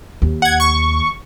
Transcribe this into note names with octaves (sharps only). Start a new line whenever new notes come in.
D#2
F#5 G#6
C#6